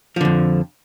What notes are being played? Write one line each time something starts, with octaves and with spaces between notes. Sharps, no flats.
F2 D3 F3